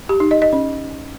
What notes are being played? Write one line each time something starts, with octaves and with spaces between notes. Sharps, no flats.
G4
D#4
D#5
D#5
C#4